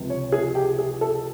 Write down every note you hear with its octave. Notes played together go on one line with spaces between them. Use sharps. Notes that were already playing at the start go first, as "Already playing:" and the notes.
Already playing: C#2 C3 F3
C#5
G#4
G4
G#4
A4